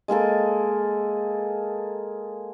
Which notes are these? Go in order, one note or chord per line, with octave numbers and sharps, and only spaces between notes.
G#3 A#3 G#4 A4